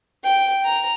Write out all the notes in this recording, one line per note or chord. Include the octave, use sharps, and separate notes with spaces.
G5
A#5